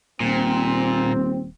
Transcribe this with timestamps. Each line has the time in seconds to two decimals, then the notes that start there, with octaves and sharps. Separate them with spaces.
0.20 D#1 A#2 C4